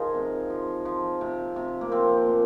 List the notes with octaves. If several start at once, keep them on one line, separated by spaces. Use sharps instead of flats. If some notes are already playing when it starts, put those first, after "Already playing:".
Already playing: F3 D#4 F4 G#4 A#4
C3
F3
F3
C3
C3
A#3
F3 C4
A#2